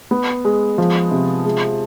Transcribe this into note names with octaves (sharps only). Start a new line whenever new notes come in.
B3
G#3
F3
C3
G#3